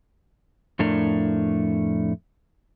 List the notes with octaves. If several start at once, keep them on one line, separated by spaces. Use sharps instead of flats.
F2 A2 A3 D4 A#4